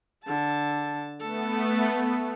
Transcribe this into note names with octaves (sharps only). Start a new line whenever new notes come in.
D3 A5
A3 B3 A4